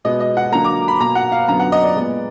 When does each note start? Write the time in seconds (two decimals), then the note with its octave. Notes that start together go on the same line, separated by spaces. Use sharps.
0.04 B2 G#3 B3 D#5
0.20 D#5
0.37 F#5
0.52 D3 F#3 A#3 A#5
0.64 D6
0.88 B5
1.00 B2 A#3 A#5
1.15 F#5
1.32 F5
1.48 F#2 D3 F#3 B3 A#5
1.60 F#5
1.72 D#5
1.83 D5
1.96 A#2 G#3 B3